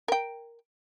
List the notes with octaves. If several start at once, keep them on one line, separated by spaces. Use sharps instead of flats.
A#4 G5